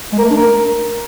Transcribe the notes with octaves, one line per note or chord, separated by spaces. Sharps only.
G#3
A#4
A3
D4
A#4